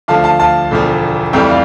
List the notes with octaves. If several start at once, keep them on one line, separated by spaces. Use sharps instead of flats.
D2 D3 F3 F5 A5
F5 A5
F5 A5
E1 E2 D3 F3
F1 F2 E3 G3 E5 G5
D5 F5